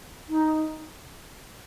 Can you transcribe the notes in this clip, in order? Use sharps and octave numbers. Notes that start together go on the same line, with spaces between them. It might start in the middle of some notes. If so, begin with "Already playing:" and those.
D#4